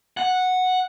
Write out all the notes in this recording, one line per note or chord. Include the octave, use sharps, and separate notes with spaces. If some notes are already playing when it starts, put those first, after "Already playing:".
F#5